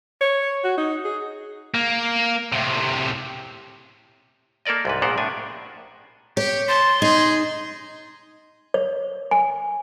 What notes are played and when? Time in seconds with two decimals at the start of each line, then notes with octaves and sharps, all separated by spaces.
0.21 C#5
0.64 F#4
0.78 D#4
1.05 G#4
1.74 A#3
2.53 A2 C3
4.65 A#3 A4 A#4 D5 D#5
4.85 C2 G#2 B4
5.02 A#1 A#2 B3 A#4 C5 F#5
5.18 A2 D4 G#5
6.37 G4 C#5
6.68 A5 C6
7.02 D#4 G#4
8.74 C#5
9.31 G#5